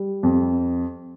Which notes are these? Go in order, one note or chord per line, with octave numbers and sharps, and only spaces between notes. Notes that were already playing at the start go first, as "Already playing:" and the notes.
Already playing: G3
F2